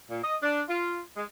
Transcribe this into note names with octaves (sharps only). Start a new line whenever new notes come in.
A#2
D#5
D4
F4
G#3